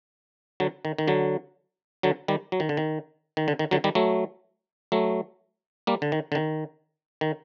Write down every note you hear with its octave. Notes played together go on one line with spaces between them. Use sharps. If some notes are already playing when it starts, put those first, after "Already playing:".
D3 F#3
D#3
D#3
D3 F#3
D3 F#3
D#3 G3
F#3
D#3
D3
D#3
D#3
D3
D#3
D3 F#3
D#3 G3
F#3 A3
F#3 A3
G3 A#3
D3
D#3
D3
D#3
D#3